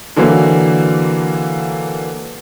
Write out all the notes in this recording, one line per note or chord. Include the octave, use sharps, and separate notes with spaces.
D3 E3 F#3 A#3